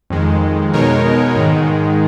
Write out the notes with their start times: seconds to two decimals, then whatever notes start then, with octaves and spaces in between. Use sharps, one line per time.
0.10 F2 D#3 G#3
0.73 B2 G#3 D#4 A#4 C#5
1.36 G#2 D#3 G#3